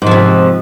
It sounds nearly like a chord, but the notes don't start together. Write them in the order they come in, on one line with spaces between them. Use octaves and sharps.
G#2 F3 C3